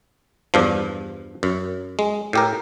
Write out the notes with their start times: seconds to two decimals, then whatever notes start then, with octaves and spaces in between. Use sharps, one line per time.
0.54 E2 G2 F3
1.43 F#2
1.99 G#3
2.33 A2 G4 A#4